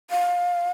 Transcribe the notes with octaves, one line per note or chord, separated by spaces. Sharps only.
F5